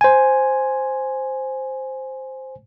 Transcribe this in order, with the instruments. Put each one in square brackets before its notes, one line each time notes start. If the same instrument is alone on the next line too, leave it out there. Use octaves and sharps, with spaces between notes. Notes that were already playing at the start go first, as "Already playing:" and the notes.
[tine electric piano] C5 G#5